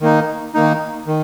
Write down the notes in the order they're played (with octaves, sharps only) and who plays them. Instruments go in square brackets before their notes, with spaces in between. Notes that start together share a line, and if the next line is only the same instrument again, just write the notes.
[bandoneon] D#3 A#3 D#4
D#3 A#3 D#4
D#3